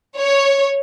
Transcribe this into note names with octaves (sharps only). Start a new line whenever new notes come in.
C#5